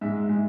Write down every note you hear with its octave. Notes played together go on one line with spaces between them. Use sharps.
G#2 G#3 E5
G#3